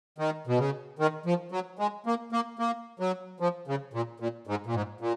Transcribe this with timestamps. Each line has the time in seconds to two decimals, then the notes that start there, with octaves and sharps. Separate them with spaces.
0.18 D#3
0.47 B2
0.58 C#3
0.99 D#3
1.26 F3
1.52 F#3
1.79 G#3
2.06 A#3
2.32 A#3
2.59 A#3
3.00 F#3
3.40 F3
3.67 C#3
3.93 A#2
4.20 A#2
4.47 G#2
4.66 A#2
4.74 G#2
5.01 A#2